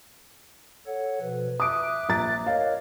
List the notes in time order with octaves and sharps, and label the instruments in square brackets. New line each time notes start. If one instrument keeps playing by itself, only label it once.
[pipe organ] A4 C#5 F#5
B2 F3 B4
[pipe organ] E5 D6 F#6 [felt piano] D#6 D7
[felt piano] A#1 A#5 A6
[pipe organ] A#4 C#5 D#5 [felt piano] F5